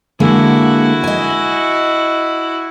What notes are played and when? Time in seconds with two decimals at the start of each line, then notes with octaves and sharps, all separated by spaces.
0.20 D3 G#3 A#3 E4 F#4
1.04 D#5 G#5